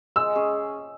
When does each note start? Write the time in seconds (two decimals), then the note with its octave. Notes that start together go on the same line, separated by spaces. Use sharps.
0.16 G#3 E6
0.35 C#4 G#4